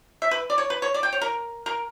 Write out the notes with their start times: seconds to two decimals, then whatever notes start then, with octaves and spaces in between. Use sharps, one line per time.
0.22 E5
0.31 B4
0.50 D5
0.58 C#5
0.70 B4
0.82 C#5
0.94 D5
1.03 G5
1.13 C#5
1.21 A#4
1.66 A#4